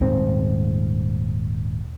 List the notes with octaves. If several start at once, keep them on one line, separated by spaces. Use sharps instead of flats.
D#1 G#2 C4